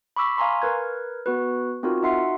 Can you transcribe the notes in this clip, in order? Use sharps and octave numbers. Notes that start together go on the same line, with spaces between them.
B5 C#6 D6 E6 B6
F5 G#5 A#5 C6 C#6
A#4 B4 G#6
B3 F#4 B4
C4 D#4 F4 F#4 A#4
D#4 F#4 E5 F#5 C6 C7